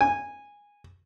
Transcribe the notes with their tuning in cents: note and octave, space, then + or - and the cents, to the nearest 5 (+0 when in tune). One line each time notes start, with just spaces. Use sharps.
G#5 -15